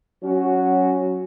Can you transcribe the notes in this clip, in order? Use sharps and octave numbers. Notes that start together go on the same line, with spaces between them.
F#3 C#4 F#4